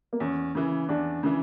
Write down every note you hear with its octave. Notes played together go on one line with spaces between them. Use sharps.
A#3
E2 C#4
C#3 E3
E2 D4
C#3 E3